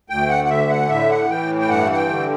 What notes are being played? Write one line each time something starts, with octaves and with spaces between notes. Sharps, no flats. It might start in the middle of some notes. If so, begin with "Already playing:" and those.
D2 G5
F#5
F#5
D3 E5
F#5
A2 E5
F#5
E3 G5
G5
G2 F#5
F#5
G5
D3